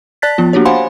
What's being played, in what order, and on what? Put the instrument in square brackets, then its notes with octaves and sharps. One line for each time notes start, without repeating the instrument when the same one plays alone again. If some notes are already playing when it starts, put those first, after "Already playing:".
[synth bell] D5 A5 F#6 A6 B6
F3 B3 F4
A#3 D4 F#4 G4 C#5
C5 F5 F#5 G#5 B5 C6